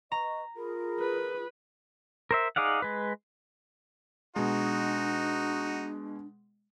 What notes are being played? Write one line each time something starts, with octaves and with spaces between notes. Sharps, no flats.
B4 D#5 A#5 C#6
F4 G#4 A#4 B5
B4
A#4 C5 E5
D#4 G#4 D5 F5 F#5
G#3 B4
B2 G#3 D4 D#4 F#4